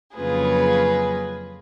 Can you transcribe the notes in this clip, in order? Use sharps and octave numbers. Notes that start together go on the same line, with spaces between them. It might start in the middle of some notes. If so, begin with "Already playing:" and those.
F2 C#3 F#3 A#3 F4 G#4 B4